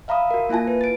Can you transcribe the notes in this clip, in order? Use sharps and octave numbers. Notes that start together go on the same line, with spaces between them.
E5 F5 A#5 B5 D#6
F#4 A#4
A#3 E4 F4 G#5 A5
B4
A6 D7